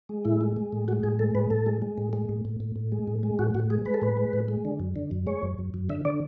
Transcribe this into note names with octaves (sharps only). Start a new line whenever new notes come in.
G#3
A2 E4
G#3
G#3
A2
G#3 F#4
A2 G#4
G#3 A4
A2 B4
A2 A4
G#3
G#3
A2
G#3
A2
A2
A2
A2
G#3
A2
G#3
A2 F#4
A2 F#4
G#3 G#4
G#3 B4
A4
A2 B4
G#3
A2
G#3
D3
F#2
D3
F#2
G#3 C#5
F#2
F#2
F#2
D3 E5
D3 D5